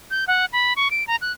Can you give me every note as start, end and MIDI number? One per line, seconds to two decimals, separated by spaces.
0.11 0.25 91
0.28 0.45 78
0.53 0.74 83
0.76 0.91 85
0.91 1.06 98
1.07 1.16 82
1.21 1.32 90